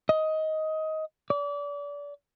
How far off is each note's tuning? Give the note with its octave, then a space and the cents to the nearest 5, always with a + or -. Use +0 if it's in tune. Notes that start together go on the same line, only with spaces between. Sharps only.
D#5 +15
D5 -30